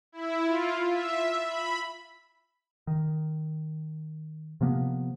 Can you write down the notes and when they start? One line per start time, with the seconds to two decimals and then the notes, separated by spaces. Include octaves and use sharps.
0.12 E4
0.45 F4
0.90 E5
1.46 B5
2.87 D#3
4.61 C3 F3 A#3 B3